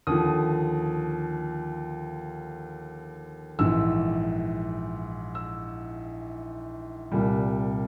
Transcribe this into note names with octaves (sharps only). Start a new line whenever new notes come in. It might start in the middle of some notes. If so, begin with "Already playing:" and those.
D#2 D3 F3 D#6
A#1 G#2 E3 E6
E6
C2 A#2 G3